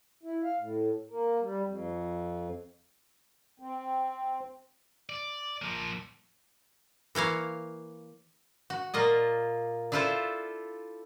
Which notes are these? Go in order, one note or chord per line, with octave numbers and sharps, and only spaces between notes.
E4
F5
A2
A#3
G3
F2
C4
D5
F3 A#3
E3 A#3 C#5 F5
F#4
A#2 A#3 F4 D#5
D4 E4 F4 A4 C5 E5